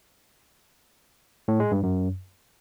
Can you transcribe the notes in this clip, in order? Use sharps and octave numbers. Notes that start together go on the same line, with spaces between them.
A2
G#3
G2
F#2